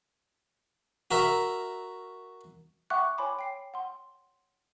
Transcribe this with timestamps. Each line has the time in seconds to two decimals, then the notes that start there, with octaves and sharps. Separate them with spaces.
1.11 F#4 A#4 E5
2.90 E5 F#5 G5 C#6 D6 F#6
3.18 C#5 G5 G#5 B5 C6 D6
3.39 G5 C7
3.74 F#5 C6